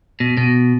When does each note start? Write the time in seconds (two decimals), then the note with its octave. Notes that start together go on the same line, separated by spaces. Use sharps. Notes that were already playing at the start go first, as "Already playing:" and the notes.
0.20 B2
0.37 B2